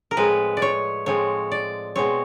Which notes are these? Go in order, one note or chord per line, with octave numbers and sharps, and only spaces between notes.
A#4
A2 F3 G#3 C4 B4
D5
C#5
A2 F3 G#3 C4 C#5
D5
B2 G#3 C4 C#5